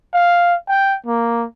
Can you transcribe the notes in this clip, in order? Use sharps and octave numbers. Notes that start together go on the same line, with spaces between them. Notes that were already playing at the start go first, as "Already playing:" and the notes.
F5
G5
A#3